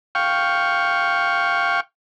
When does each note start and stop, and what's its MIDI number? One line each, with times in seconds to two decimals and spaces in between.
0.15 1.80 77
0.15 1.80 79
0.15 1.80 85